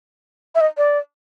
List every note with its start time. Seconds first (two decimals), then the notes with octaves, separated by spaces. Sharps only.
0.55 E5
0.61 D#5
0.77 D5